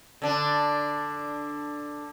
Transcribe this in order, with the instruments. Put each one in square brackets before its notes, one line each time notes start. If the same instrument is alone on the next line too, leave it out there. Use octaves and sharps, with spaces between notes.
[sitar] D3 D4